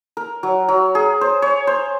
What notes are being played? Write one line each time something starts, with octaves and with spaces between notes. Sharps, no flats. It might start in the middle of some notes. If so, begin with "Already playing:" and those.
A#4
F#3
F#3
G#4
C5
C#5
C5